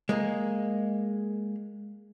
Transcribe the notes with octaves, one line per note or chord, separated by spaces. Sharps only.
G#3 A#3